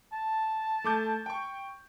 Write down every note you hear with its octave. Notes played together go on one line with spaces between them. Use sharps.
A5
A3 D6 G6
G5 C#6